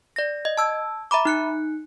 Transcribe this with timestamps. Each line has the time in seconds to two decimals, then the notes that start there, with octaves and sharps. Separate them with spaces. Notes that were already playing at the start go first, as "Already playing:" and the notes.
0.16 D5 A#6
0.45 D#5
0.57 A5 E6 G#6
1.11 E5 A#5 B5 D6
1.25 D#4 F#6 C#7